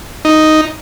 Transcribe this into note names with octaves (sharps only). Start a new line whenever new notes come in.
D#4